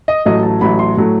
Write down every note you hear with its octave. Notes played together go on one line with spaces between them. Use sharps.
D#5
A1 A2 F#3 A3 D#5
A5
A1 A2 F#3 A3 B5
C6
A2 F#3 A3